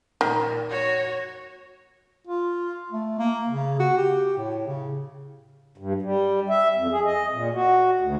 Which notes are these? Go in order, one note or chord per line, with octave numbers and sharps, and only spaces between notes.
A#2 D#3
F#4 C#5
F4
A3
A#3
C#3
F#4
G4
A2
C#3
G2
G3
E5
F2
G#4
D#5
A#2
F#4
D2